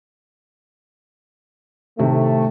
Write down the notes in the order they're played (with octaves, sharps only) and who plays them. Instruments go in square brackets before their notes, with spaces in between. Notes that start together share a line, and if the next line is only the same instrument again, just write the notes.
[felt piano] A2 C3 D#3 [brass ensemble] A3